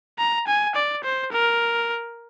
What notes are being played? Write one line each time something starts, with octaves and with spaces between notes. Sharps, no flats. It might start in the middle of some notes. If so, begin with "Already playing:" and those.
A#5
G#5
D5
C5
A#4